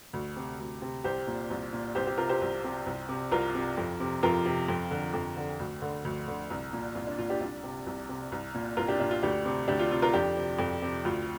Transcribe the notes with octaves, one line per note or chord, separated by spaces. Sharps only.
D2
C3
D2
C3
C2 G4 C5
A#2
C2
A#2
C2 G4 C5
G4 C5
C3 F4 A#4
G4 C5
C2
C3
C2
C3
C2 F4 A#4
C3
F2
C3
F2 F4 A#4
C3
F2
D3
F2
D3
D2
D3
D2
D3
C2
A#2
C2 F4
D4
A#2 F4
D4 G4
C2 D4
C3
C2
C3
C2
A#2
C2 F4 A#4
D4 G4
A#2 D4
F4
D2 D4 G4
C3
D2 D4 G4
F4
C3 F4
F4 A#4
F2 D4 G4
C3
F2
C3
D2 F4